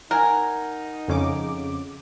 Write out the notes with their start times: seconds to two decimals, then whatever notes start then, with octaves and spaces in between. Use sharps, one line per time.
0.11 D#4 A#4 F#5 G#5
1.08 F2 C#3 D6